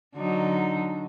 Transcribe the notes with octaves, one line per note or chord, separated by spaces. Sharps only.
D3 F#3 D#4